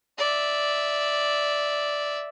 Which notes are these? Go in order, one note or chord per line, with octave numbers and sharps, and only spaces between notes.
D5 E5